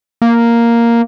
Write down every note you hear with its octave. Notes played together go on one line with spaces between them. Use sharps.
A#3